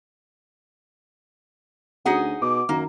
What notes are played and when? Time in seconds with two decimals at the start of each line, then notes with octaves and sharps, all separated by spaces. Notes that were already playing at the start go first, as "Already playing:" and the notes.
2.06 D2 C#4 D#4 F#4 G#4 F#5
2.42 B2 D6
2.69 F#2 D#3 A#3